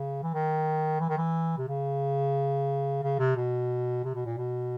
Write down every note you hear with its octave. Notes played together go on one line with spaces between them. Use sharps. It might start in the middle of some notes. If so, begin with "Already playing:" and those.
Already playing: C#3
E3
D#3
E3
D#3
E3
C3
C#3
C#3
C3
B2
C3
B2
A#2
B2